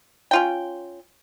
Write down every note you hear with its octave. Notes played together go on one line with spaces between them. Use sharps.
C#4 F4 G5